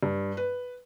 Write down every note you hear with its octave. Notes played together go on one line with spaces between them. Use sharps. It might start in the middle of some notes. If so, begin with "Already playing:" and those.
G2
B4